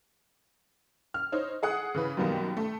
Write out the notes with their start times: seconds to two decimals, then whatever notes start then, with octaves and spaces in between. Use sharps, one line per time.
1.14 F6
1.32 D#4 C5 C#5
1.63 G#4 F#5 D#6 F#6
1.95 C#3 E3 B4
2.17 F#2 B2 D#3 G3 A#3 B3
2.57 A3 A4